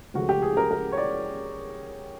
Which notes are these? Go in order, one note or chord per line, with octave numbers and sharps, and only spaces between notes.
C#2 C#3 F3 A3 F#4
G4
G#4
A#4
A#4
C#5
D5